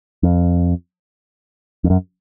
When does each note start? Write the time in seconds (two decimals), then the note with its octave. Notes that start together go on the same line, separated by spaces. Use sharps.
0.23 F2
1.84 F2
1.90 F#2